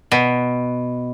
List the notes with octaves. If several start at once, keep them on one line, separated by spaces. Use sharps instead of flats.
B2